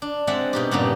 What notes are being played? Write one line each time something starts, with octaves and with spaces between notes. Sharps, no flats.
D4
G#3 C4 D5 E5 F#5
B2 D#4 G4
G2 A#2 C#3 G3 B3 D#4